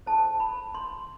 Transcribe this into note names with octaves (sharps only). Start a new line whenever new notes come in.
E4 A4 C5 A5
B5
C6